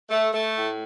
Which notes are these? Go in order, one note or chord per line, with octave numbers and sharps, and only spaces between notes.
A3
A3
A2